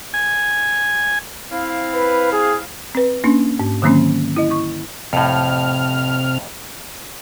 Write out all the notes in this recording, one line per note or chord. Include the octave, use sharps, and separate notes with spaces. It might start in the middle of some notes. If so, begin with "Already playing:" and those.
G#5
C4 E4 F5
B4
G#4
C4 B4
A#3 C#4 D4
G#2
D3 D#3 F#3 A#3 C4 C#4
E4 D#5
E4 C#6
F2 A2 C3 F6